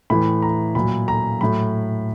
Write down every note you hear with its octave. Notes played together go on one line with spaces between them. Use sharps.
A2 E3 B5
A#5
A#2 F#3 B5
A#5
A2 F#3 B5